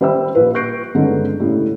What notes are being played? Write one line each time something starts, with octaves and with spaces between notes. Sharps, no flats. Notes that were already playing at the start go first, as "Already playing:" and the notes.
G3 C5 E5 G5 B5 E6
A#1 B4
C#6 F#6 G6 A#6 C7 D7
G2 D3 G#3 B3 C#4 D#4
A2 C#3 G3